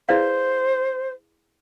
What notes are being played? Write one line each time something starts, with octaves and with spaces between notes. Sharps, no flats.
E4 G#4 B4 C5 D5 F5